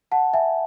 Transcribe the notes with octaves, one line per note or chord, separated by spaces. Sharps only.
F#5 A5
E5 G#5